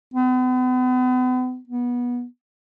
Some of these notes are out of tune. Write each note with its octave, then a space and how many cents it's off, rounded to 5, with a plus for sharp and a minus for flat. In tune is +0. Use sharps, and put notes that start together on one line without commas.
B3 +40
B3 -20